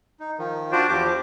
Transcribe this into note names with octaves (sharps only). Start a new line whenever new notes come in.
D#4
D#3 F3
D4 F4 F#4 C5
E2 F3 G4 D6